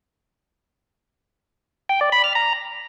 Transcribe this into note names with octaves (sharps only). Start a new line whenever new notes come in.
G5
D5
B5
F6
A#5